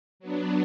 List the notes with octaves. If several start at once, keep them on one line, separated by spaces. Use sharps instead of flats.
F#3 B3 D4